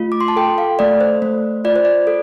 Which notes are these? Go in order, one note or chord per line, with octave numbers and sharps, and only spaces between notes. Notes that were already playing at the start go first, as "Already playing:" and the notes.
Already playing: A3 F4
D6
C6
A5
A4 G5
F5
A3 D5
C5
A3
F4 D5
C5
D5
A4